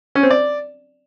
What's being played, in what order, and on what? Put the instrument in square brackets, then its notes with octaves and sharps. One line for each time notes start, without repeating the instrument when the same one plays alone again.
[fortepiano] C#4
C4
D5